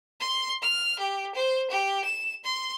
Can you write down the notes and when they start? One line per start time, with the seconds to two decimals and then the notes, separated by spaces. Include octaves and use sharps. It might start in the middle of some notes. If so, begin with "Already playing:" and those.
0.20 C6
0.62 F6
0.99 G4
1.35 C5
1.70 G4
2.04 E7
2.44 C6